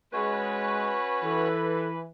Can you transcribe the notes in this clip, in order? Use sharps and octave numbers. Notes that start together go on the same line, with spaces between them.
G#3 C#4 F#4 B4 C#5
E3 A4